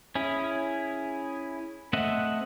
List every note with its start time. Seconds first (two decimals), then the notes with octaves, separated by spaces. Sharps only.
0.15 C#4 E4 G#4
1.93 A3 C4 D#5 E5 F#5